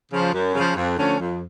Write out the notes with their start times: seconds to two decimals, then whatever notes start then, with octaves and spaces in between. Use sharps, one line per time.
0.12 C#3 F3
0.33 F#2
0.54 C#3 F3
0.76 F2
0.98 D3 F3 A3 C#4
1.20 F2